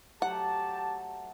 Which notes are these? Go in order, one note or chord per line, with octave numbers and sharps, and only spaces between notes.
F#3 A3 G4 F#5 A5